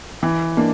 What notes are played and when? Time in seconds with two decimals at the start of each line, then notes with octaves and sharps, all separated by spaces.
0.23 E3
0.57 A#3 D4